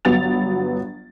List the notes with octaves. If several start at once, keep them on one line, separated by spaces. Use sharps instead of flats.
G1 F#3 B3 A6 F7